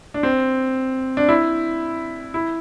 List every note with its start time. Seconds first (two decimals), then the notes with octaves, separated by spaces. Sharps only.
0.14 D4
0.23 C4
1.17 D4
1.29 E4
2.34 E4